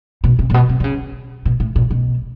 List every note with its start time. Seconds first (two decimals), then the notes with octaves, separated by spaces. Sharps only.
0.24 B2
0.39 C3
0.50 A#2
0.54 B2
0.69 C3
0.80 D3
0.84 C#3
1.45 B2
1.60 A2
1.76 A#2
1.90 B2